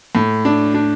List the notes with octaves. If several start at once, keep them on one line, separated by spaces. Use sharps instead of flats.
A2
D4
D4